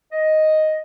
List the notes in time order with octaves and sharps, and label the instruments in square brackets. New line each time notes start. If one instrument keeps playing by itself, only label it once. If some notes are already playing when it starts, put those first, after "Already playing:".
[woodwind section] D#5